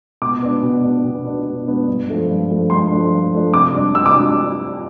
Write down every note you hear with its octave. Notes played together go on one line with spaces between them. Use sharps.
B2 D6
B3 D4
B2
B3 D4
B2
B3 D4
B2
B3 D4
G2
F3 A3 D4
G2
F3 A3 D4
G2 C6
F3 A3 D4
G2
F3 A3 D4
C3 D6
G3 D4
C3 E6
D6
D4